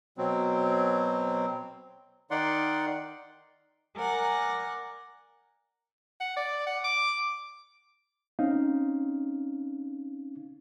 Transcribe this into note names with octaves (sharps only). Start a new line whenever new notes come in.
B2 F#3 C4
D#3 D#4 D5 F#5 C6
A#4 D5 F#5 G#5
F#5
D5
F#5
D6
C4 C#4 D#4 F5